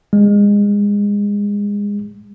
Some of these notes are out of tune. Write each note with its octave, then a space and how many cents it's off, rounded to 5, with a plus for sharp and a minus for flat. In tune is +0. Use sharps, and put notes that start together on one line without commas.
G#3 -25